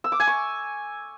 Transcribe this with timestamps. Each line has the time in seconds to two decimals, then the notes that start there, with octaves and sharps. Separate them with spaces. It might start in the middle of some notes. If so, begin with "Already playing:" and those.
0.04 E6
0.12 D6
0.20 G#5
0.27 C#6